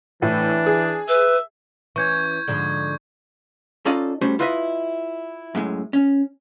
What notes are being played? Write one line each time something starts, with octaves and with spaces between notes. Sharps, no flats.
A2 E3 D4
G#4
B4 E5
E3 C#4 C#6 G6 G#6
G#2 D3 F3
C#4 D#4 F4 A4 D5 D#5
G3 A3 C#4 F#4 C5
E4 F4 B4 C5 D#5 E5
F#2 A2 G#3
C#4